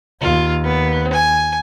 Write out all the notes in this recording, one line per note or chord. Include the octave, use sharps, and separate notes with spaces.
D#2 F4
B3
G#5